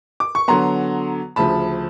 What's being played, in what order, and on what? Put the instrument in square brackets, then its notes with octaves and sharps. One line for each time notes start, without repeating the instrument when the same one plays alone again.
[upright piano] D6
C#6
D3 F#3 B3 A#5 C6
D2 C#3 F3 A5 B5